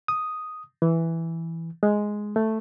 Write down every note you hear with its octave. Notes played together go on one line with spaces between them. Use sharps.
D#6
E3
G#3
A3